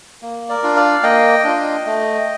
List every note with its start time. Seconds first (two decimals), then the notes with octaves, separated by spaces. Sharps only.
0.22 A#3
0.49 A#4 D5
0.63 D4 F4
0.76 D5 F5
1.03 A#3 D#5 G5
1.44 D4 F4
1.85 A3